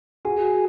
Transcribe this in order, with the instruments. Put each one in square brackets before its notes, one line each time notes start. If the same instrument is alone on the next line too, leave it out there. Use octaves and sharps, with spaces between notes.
[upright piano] F#4 [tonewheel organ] G#4